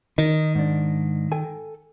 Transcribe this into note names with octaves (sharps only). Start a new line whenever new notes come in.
D#3 D#4
G#2 D4
A4 G5 G#5